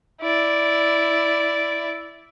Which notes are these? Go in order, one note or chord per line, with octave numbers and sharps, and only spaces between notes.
E4 D5